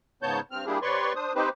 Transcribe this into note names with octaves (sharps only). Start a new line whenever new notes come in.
G#2 C#3 B3 C#5 A5 G6
G2 C4 F6
G3 A#3 D4 E4 G4 G#4
C3 B4 C#5 D5 C6 C#6
D4 C5 D#6
C4 D#4 G4 B4 C5